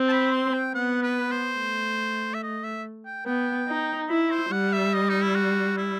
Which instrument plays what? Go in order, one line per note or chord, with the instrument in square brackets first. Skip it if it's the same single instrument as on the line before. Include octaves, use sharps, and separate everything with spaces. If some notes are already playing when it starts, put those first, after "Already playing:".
Already playing: [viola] C4
[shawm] A5
B5
C6
G5
[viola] B3 [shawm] F#5
[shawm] B4
C5
[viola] A3
[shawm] E5
D#5
E5
G5
[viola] B3 [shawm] G5
[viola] D#4
[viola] E4 [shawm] B5
[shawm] C5
[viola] G3 [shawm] F#5
[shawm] E5
D#5
D#4
E4
F#4
E4